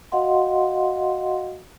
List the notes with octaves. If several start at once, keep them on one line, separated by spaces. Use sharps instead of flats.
F#4 D#5 F5 F#5 C6